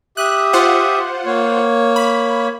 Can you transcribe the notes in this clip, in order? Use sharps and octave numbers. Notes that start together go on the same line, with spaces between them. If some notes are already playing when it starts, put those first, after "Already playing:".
G4 E5 D#6 F#6
F4 C5 F#5
A#3 C#5
B5